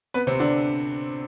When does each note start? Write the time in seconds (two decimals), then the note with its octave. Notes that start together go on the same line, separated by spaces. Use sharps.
0.14 B3 B4
0.27 C3 C4
0.40 D3 D4